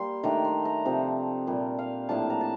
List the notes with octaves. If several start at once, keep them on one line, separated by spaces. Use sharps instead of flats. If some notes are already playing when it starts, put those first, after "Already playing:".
Already playing: G3 A#3 C6
D#3 A3 D4 A#5
C6
A#5
C3 F3 C4
A#2 G3 A#3
F5
A2 F3 A#3 D4 A5
A#5
A5